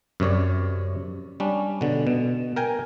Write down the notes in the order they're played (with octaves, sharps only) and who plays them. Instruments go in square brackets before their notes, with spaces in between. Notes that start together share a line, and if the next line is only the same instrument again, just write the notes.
[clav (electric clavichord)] F#2 C3 C#5 D5
G3 C#4 D4
B2 D3
B2
A#4 G5 G#5